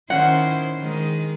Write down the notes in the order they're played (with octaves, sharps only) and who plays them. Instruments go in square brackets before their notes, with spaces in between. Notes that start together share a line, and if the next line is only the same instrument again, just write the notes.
[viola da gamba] D#3 E4 C5 [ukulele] C#4 F#5
[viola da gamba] D#3 G#3